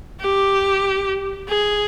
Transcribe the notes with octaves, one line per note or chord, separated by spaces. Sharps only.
G4
G#4